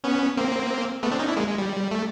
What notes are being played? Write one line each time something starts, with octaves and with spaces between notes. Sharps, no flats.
B3 C#4
A#3 C4
A3 B3
C4 D4
C#4 D#4
D4 E4
G#3 A#3
G#3
G3
A3